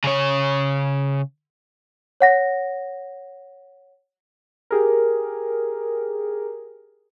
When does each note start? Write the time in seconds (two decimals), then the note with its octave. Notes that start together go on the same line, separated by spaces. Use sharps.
0.04 C#3 C#5
2.21 C#5 F#5 A#6
4.71 G4 G#4 A#4